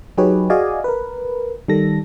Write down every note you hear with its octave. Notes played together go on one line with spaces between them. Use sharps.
F#3 D#4 G4 G#4 B4 C#5
F#4 G#4 D5 D#5 F5 G#5
A#4 B4
D#3 G3 A4 A#6